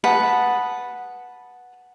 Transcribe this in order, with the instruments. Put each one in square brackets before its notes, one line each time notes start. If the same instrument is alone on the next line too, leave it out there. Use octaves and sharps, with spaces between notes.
[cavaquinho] B4 F#5 A5 D#6